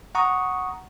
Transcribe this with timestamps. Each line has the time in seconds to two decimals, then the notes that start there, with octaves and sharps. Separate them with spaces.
0.15 F#5 A#5 C#6 D#6